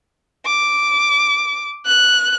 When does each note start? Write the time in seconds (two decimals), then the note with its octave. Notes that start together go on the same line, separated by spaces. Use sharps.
0.46 D6
1.86 F#6